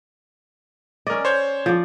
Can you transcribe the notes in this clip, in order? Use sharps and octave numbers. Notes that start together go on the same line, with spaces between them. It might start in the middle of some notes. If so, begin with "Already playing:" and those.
C#4 A#4 D5 D#5
C5 C#5 G6
F3 D5